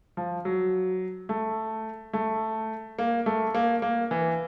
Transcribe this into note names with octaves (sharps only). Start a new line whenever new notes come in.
F3
F#3
A3
A3
A#3
A3
A#3
A#3
E3